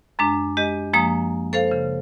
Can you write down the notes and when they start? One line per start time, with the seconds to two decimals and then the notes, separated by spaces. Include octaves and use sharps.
0.19 F#2 G#3 D4
0.57 G#3 G4 D#5
0.93 F#2 F3 G#3 A#3 D#6
1.53 A4 C5 F5
1.71 C#3